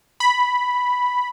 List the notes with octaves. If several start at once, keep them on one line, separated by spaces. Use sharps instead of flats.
B5